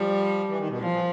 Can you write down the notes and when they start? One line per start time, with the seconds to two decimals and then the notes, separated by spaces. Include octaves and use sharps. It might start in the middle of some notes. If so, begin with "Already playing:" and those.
Already playing: F3 G3
0.49 E3
0.59 D#3
0.69 B2
0.80 A#2 F3
0.91 A#2